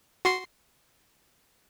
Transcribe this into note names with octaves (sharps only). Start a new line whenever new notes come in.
F#4 C6 C7